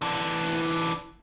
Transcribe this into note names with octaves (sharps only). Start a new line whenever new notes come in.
E3 D4